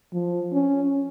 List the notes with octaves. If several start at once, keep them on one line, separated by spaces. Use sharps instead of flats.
F3
C#4